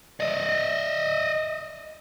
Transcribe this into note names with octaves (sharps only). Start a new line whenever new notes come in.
D5 D#5